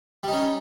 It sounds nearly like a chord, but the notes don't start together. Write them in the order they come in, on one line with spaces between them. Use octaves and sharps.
G3 D#4 C#4